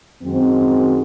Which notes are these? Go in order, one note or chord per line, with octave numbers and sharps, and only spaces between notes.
F#2 D#3 G#3 C4 F#4